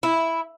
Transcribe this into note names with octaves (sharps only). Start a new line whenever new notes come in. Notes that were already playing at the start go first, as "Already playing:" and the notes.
E4